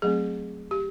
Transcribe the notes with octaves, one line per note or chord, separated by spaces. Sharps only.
F#3 A3 C4 G#4
G4